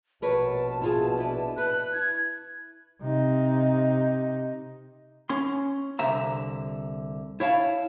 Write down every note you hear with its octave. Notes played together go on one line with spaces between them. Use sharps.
A#1 B2 A#4 B4 C#5 A5
E4 F4 G#4
D4 E4 B4
B4 F#6
E4 G#6
C3 D#4
C#4 C6
C2 D3 E5 A#5
E4 C#5 F5 A5